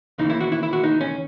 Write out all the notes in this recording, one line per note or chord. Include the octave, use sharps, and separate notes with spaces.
D#2 C#3 E3 D#4
E4
F#4
E4
E4
F#4
D#4
C#4